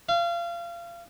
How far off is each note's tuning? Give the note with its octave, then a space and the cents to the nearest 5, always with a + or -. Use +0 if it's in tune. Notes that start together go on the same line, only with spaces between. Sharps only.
F5 -30